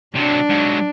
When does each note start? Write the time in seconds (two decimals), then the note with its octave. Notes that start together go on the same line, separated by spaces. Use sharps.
0.16 C3 F#3 D4
0.50 G#2 F#3